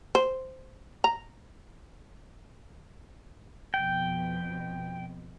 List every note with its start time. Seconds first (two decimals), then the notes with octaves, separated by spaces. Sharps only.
0.15 C5
1.04 A#5
3.74 F2 B2 G5